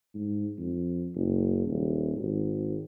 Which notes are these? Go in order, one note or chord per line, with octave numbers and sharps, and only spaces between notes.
G#2
F2
F#1
D#1
G#1